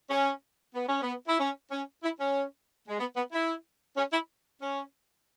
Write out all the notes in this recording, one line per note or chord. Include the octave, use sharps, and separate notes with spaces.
C#4
B3
C#4
B3
E4
C#4
C#4
E4
C#4
G#3
B3
B3
E4
C#4
E4
C#4